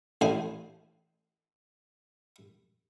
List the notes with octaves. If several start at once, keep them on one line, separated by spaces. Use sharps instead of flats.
A1 C5 G#5